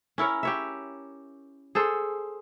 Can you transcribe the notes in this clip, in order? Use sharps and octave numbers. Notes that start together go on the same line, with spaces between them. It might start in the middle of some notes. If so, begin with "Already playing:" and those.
C#4 E4 A#4 C#5
G4 C#5 E5
G#4 A4 C5